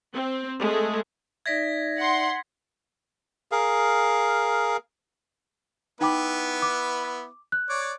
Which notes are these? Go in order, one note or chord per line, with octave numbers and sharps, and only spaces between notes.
C4
G#3 A3 G#4
D#4 D5 E5 G#6 A#6 B6
F#5 C6
G#4 A#4 F5
B3 D#4 E4 B4 G5 D6
D6
F#6
C#5 D5 D6